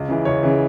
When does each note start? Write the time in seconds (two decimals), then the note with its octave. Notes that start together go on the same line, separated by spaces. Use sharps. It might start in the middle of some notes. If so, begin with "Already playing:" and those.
Already playing: C#2
0.09 C#3 E3
0.25 C#2 C#5
0.43 C#3 E3